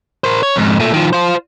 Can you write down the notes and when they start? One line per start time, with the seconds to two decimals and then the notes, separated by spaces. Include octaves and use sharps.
0.24 A#4 C5
0.43 C#5
0.56 F2 G#2
0.80 A#2 A3
0.94 D#3 F3
1.13 F4 C5